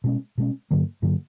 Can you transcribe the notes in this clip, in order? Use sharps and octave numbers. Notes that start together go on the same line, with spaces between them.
B2 G#3 C#4
B2 G#3 C#4
G2 D3 F#3 A#3
G2 D3 F#3 A#3